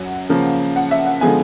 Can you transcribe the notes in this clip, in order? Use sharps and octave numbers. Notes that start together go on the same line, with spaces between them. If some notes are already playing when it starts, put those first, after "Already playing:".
Already playing: F#2 F#3 F#5
C#3 F3 A#3
F#5
E5
F#5
D3 F3 G#3 B3 G#5